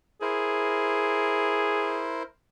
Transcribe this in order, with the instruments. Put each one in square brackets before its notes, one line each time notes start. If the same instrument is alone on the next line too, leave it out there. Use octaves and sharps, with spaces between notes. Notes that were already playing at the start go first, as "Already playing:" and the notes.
[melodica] E4 A#4 C5 [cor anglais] G#4